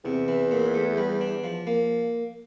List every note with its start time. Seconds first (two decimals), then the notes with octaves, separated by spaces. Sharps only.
0.04 E2 C3
0.28 E3
0.51 A#2
0.74 A3
0.98 G3
1.21 D4
1.44 F3
1.67 A#3